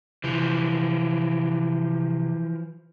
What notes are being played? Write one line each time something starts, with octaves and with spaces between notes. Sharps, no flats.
C3 E3 F3